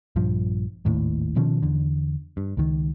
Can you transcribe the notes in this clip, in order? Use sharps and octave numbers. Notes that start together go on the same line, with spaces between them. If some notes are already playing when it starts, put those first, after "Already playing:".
A#1 G2 F3
G#1 D#2 A2
B2 D#3 F3 C#4
E2 D3
G2
C#2 D#3